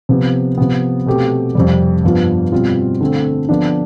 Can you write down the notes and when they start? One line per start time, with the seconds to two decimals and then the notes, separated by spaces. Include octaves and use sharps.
0.09 C3 F3 B3
0.57 C3 F3 B3
1.06 B2 A3 C4 G4
1.55 F2 C3 G3
2.04 G2 F3 B3 F4
2.52 B2 G3 C4 F4
3.01 D3 A3 C4
3.49 D3 F3 B3 D4